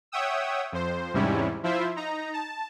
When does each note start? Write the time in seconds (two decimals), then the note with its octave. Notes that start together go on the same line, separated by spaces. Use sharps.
0.12 C#5 E5 F#5 G5 D#6 E6
0.72 F2 C5
1.13 E2 G#2 C3 G3 C#4 E4
1.63 F3 E4 F4 C5 E5
1.96 D#4 A#5
2.33 A5